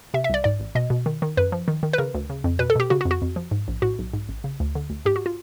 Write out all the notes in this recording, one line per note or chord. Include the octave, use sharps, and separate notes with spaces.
C3 E5
E5
C2 D5
G#2 D5
A1
B2 D#5
B2
D#3
D#3
F#2 B4
F3
D#3
D#3
B4
C#3 A#4
D2
C#3
F2
B2 B4
A4
B2 G4
C#3 F#4
F#4
F2
F#4
F2
F3
G#2
A#1
A2 F#4
B1
G#2
A1
C#3
D2
D3
D2
G#2 G4
F#4
F4